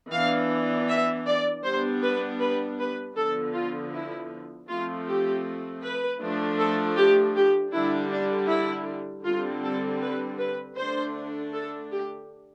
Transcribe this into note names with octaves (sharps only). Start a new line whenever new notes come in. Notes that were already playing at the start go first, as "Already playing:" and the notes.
E3 B3 D4 F5
E5
D5
G3 B3 D4 C5
B4
B4
B4
D3 F3 B3 A4
F4
E4
F3 A3 C4 F4
G4
B4
F3 A3 D4
A4
G4
G4
D3 G3 D4 E4
D4
E4
D3 G3 C4 F4
A4
B4
B4
D3 A3 D4 C5
A4
G4